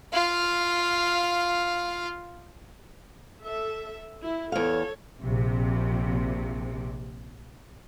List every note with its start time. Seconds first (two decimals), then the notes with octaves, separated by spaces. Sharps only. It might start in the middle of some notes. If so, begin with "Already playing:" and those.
0.13 F4 F5
3.40 A4 E5
4.21 E4
4.52 E2 A4 C#5 F5
5.20 A#1 C3